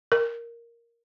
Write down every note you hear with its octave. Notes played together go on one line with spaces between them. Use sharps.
A#4